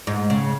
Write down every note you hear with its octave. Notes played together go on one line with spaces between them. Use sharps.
G#2
C#3